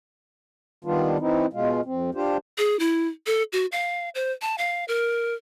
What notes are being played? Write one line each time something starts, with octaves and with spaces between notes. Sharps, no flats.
D#3 G3 B3 D4 F4
E3 C4 D#4 E4
B2 G#3 F4
F2 C4
D4 F4 G4 C5
G#4
E4
A4
F#4
F5
C5
A5
F5
A#4